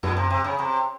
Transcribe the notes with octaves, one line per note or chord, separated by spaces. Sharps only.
F#2 A#2
C3
C3
C#3
C3